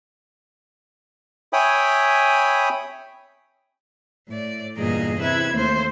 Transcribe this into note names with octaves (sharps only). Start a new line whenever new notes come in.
C#5 E5 G5 G#5 B5 D#6
A2 D5
E2 G2 A#2 G#4 D#5 A#5
C3 E4 B4 E6 G#6
D#2 A3 C5